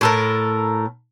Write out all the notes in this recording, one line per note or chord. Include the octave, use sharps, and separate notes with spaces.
A2 A4 A#4